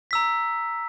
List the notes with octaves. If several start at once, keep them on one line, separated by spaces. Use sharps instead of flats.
A#5 E6 B6